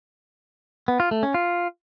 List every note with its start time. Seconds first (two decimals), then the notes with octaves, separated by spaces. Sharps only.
0.88 B3
1.00 F4
1.11 A3
1.23 C#4
1.34 F4